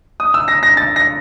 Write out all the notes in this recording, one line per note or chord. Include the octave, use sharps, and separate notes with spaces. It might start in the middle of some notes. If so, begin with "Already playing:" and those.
D#6
E6
A#6
A#6
A6
A#6